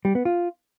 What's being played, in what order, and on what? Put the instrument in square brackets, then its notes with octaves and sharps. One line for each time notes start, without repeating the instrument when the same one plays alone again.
[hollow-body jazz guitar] G3
B3
F4